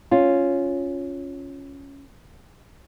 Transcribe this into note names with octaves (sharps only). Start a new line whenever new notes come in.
C#4 F4